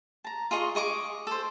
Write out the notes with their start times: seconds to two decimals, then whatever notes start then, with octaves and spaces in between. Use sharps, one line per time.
0.24 A5 A#5
0.51 F4 G#4 D#5 C#6
0.75 G#4 D#5 C#6 D6
1.27 A4 C5